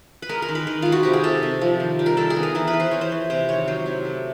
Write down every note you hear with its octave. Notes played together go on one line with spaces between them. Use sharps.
B4
G#3 A#4
A#4
D#3
B4
D#3
G#3 F4
F#4
C3 G4
G#4
C3 A4
C3
F3
D#3
G3
A#4
D#3 A4
G#4
B3
A#4
E3 A#4
B4
E3
C5
E3 C#5
C5
E3
C3 C5
D#3 C#5
F#3 C5
C3
A3